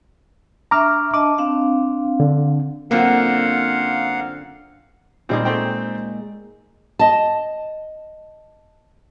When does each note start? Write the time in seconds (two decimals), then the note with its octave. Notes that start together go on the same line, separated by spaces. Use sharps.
0.71 D4 E5 A#5 C#6 D6 F6
1.14 D4 D#5 A5 D6
1.38 C4 D4 F5
2.20 D3
2.91 F#2 D3 A#3 C4 F4 F#4 F5 F#5
5.29 A#2 G3 G#3 C4 D#4
5.45 A3 C4 G5
6.99 D#5 A5